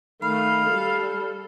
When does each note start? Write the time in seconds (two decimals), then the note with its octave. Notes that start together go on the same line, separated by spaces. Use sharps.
0.22 D#3 A3 F5 B5
0.67 G3 A4